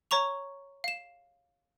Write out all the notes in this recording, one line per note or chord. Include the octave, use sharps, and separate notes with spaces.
C#5 A#5 C#6 F7
F5 E7